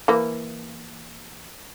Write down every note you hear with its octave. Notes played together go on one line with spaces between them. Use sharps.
E3 A#3